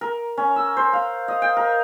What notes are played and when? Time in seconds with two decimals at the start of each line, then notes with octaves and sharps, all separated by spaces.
0.01 A#4
0.37 C#4
0.56 E6
0.77 C5
0.93 F5
1.28 D#5
1.42 G5
1.57 A#4